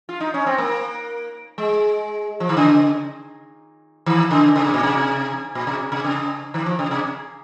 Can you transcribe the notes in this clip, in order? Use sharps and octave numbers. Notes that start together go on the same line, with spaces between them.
F4
D#4
C#4
C4
A#3
G#3
F3
D#3
C#3
D#3
C#3
C#3
C3
A#2
C3
A#2
C3
C3
C#3
D#3
F3
C#3
C3